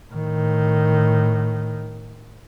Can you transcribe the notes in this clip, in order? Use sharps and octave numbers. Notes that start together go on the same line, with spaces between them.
A2 D#3